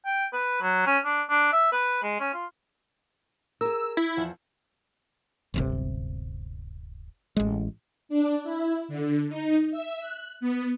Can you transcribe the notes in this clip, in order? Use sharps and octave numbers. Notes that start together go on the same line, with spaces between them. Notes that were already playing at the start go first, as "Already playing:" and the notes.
G5
B4
F#3
C#4
D4
D4
E5
B4
G#3
C#4
F4
G#4 A#4 E6
E4
E2 F3 F#5
D1 G1 C3
A1 G#3
D4
E4
D3
D#4
E5
F#6
B3